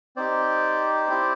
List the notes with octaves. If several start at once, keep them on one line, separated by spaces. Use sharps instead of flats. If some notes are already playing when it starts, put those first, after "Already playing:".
C4 D#4 G4 C5 D5
C4 E4 G4